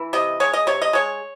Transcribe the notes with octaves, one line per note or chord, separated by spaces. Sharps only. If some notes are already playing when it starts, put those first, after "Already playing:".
Already playing: E3
C3 D#5
G#3 C#5
D#5
C3 C#5
D#5
G#3 C#5